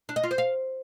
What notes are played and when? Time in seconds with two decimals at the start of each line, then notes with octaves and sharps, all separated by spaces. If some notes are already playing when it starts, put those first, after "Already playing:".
0.09 D4
0.16 D#5
0.23 F4
0.31 C5
0.38 F5